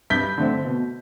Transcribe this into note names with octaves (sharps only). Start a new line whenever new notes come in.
G2 G6 B6
D3 A3 C4
B2